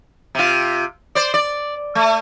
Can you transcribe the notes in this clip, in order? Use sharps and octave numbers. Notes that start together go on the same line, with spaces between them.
C3 F4
C5 D5
D5
A3